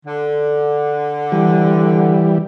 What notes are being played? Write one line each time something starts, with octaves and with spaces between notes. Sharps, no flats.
D3
E3 G3